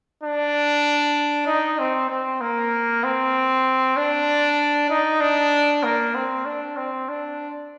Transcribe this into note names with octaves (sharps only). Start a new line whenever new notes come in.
D4
D#4
C4
C4
A#3
C4
D4
D#4
D4
A#3
C4
D4
C4
D4